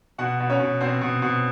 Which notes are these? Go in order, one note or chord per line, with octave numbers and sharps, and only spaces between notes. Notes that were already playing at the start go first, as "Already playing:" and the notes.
B2 F#4 F#5
B2
C#4 C#5
B2
B2 C4 C5
B2
B2